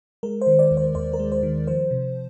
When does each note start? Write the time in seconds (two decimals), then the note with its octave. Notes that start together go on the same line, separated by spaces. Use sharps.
0.23 G#3 A#4
0.41 C5
0.47 D#3
0.59 D5
0.71 D#2
0.77 C5
0.95 D#2 C5
1.13 A#4
1.19 G#3
1.32 C5
1.43 D#3
1.67 F3 C5
1.91 C3